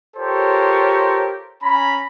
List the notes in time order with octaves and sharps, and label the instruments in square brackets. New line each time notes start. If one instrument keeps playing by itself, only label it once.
[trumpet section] F4 G4 A4 A#4 C5 C#5
C#4 G#5 A#5 B5